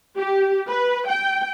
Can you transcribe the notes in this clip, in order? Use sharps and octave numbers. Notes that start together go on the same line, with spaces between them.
G4
B4
G5